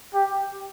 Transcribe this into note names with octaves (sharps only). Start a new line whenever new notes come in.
G4